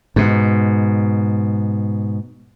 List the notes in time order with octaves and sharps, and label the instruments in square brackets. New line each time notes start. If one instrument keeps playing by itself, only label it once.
[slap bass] G#2 B2